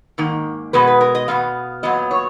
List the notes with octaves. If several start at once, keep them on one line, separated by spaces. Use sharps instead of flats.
G#2 D#3 A#3
B2 G#3 B3 B4
B4
A#4
D#5
B2 G#3 B3 F5
A#2 F#3 B3 D#5
C#5